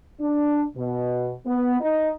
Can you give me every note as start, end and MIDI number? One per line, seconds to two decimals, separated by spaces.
0.20 0.62 62
0.76 1.32 47
1.46 1.77 59
1.81 2.11 63